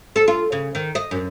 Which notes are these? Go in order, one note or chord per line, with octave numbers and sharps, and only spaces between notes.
A4
F4
C#3
D#3
D#5
F#2